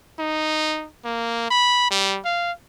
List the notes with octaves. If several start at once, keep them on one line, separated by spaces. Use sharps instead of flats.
D#4
A#3
B5
G3
F5